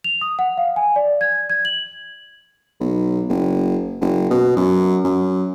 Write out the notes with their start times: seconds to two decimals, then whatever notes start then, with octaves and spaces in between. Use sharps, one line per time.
0.04 F7
0.21 D#6
0.39 F#5
0.57 F5
0.76 G#5
0.96 D5
1.21 G#6
1.50 G#6
1.65 F#7
2.80 B1
3.29 F#1
4.01 F#1
4.30 B2
4.56 F#2
5.04 F#2